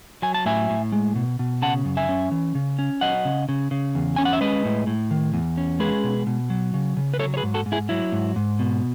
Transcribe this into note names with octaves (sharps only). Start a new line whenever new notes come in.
F#3 G#5
A5
A2 E5 G#5
A2
G#3
B2
B2
C#3 F#5 A5
F#2
E5 G#5
C#4
E3
C#3
C#4
F#3 D#5 F#5
C#3
C#3
C#3
E2
C#4 G#5
F#5
E5
G#3 B4 D#5
A2
A2
D#3
E2
C#4
G#3 G#4 B4
B2
B2
F#3
C#3
C#3
B4
F#3 A4 C#5
C#5
G#4 B4
G#2
F#4 A4
G#2
E4 G#4
F#3 E4
G#2
G#2
B2